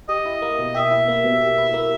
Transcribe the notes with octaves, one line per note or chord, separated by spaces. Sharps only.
G4 D#5
E4
A#3
B2
G4 E5
E4
A#3
B2
G4
E4
A#3